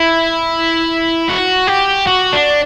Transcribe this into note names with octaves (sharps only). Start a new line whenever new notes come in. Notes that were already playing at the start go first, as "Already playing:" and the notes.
Already playing: E4
F#4
G4
F#4
D4